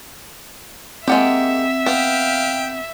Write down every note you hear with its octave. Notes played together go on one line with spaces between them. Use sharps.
G#3 A#3 C4 G4 E5 F#5
B3 F5 G5